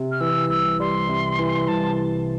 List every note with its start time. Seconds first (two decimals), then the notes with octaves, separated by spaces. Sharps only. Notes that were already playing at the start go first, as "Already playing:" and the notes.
Already playing: C3
0.12 F6
0.20 E3 E6
0.49 C2 E6
0.80 G3 C6
1.09 C3
1.39 E3
1.68 C2 A5